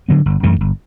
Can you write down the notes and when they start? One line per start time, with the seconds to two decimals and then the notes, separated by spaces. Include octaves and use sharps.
0.09 D3 F#3 B3
0.26 G1
0.43 F#2 E3 A3
0.61 G1